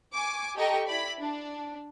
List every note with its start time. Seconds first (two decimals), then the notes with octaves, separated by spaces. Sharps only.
0.13 G#5 C#6 D6
0.56 G4 A4 D#5 G5 A#5 C#6
0.86 E4 D5 B5
1.20 D4